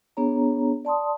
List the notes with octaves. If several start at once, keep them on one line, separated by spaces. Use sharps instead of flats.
B3 D4 G#4 C#5 A#5
D5 A5 C6 D#6